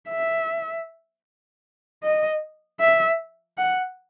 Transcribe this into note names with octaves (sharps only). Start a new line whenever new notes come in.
E5
D#5
E5
F#5